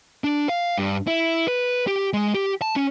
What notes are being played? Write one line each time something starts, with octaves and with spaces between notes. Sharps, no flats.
D4
F5
G2
E4
B4
G4
G#3
G4
A5
C#4